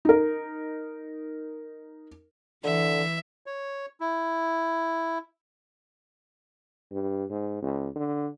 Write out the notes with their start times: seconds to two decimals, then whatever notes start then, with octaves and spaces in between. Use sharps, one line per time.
0.05 D#4 A#4
2.64 D3 E3 E5
3.46 C#5
4.00 E4
6.91 G2
7.30 G#2
7.62 C#2
7.96 D3